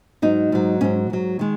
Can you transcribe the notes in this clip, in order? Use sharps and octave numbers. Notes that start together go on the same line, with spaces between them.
G#2 F#3 D#4
G#2 F#3
G#2 F#3 C#4
G#2 F#3
D#3 G#3